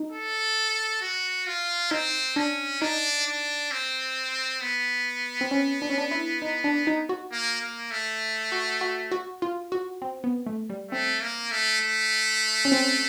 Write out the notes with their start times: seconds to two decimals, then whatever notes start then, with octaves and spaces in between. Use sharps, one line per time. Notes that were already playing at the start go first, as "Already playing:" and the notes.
Already playing: D#4
0.12 A4
1.02 F#4
1.46 F4
1.91 C4 D#4
2.36 C#4 D4
2.81 D4 D#4
3.26 D4
3.71 C4
4.61 B3
5.41 C4
5.51 C#4
5.82 D4
5.90 C#4
5.98 D4
6.11 E4
6.42 D#4
6.64 D4
6.87 D#4
7.09 F#4
7.32 A#3
7.61 A#3
7.91 A3
8.52 F#4
8.81 F#4
9.12 F#4
9.42 F4
9.72 F#4
10.02 C4
10.24 B3
10.46 A3
10.70 G3
10.91 A3 C4
11.21 A#3
11.51 A3
11.81 A3
12.65 C#4
12.72 C4